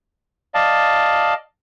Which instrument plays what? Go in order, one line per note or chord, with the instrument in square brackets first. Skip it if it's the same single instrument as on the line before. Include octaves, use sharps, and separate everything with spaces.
[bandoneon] D5 D#5 F5 A5